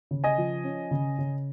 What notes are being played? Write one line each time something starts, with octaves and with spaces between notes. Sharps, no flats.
C#3
D#5 G#5
F3
C#4
C#3
C#3